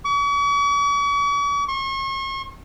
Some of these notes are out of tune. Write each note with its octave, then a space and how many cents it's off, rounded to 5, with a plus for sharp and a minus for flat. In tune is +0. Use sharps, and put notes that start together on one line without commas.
C#6 +45
C#6 -40